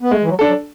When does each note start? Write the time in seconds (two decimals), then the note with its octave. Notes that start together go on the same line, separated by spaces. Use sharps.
0.02 B3
0.11 G#3 A3
0.23 E3
0.29 F#3
0.39 D4 A4
0.48 F#3